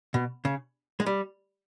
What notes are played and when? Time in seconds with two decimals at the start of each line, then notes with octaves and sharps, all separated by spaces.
0.14 B2
0.45 C#3
1.00 G#3
1.06 G3